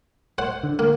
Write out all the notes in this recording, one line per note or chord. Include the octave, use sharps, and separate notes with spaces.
C5 F#5
D3
A#3